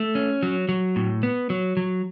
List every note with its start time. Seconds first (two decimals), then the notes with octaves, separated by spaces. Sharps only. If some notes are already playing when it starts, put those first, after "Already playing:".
Already playing: A3
0.15 C#4
0.43 F#3
0.69 F#3
0.96 A2
1.23 B3
1.50 F#3
1.77 F#3